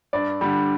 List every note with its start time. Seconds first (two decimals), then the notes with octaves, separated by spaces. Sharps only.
0.13 G2 D5
0.41 D3 G3